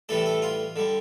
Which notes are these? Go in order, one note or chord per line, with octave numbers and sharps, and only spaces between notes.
A2 E3 G3 A4
A4
F4
D3 G3